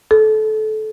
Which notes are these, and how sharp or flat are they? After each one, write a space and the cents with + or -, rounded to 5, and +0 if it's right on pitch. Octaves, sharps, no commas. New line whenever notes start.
A4 -25